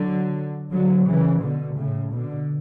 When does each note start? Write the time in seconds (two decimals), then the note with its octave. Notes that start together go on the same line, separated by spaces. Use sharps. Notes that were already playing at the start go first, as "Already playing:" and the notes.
Already playing: D3 F#3
0.71 D3 F#3
1.07 C#3 E3
1.42 B2 D3
1.77 A2 C#3
2.11 B2 D3